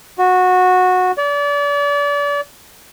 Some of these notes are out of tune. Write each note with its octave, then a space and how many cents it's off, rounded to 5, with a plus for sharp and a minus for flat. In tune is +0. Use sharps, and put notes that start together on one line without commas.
F#4 -15
D5 -35